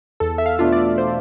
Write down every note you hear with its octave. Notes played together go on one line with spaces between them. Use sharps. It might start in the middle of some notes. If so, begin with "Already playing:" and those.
E2 A4
E5
F5
B2 A3 D4 F4
D5
C5